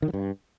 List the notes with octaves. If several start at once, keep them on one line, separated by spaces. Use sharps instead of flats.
D#3
F#3
G2